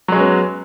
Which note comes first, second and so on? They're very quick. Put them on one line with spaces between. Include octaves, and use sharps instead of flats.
F#3 G#3 C#4 B3